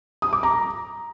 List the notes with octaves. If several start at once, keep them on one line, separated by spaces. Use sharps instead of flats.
D#6
D6
A#5